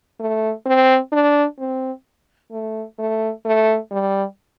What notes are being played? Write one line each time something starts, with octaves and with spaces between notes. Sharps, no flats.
A3
C4
D4
C4
A3
A3
A3
G3